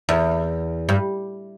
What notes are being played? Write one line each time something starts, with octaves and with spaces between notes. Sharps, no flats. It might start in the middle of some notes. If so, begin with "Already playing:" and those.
E2
G2